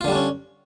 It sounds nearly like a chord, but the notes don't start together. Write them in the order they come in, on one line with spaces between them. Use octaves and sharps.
F4 D3 G3 D4 C#4